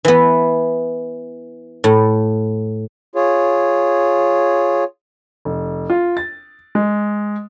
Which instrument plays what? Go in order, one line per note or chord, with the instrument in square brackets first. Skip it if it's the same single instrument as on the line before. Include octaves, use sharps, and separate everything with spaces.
[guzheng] E3 B3
A2
[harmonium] F4 G#4 C#5
[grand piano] F1
F4
A6
G#3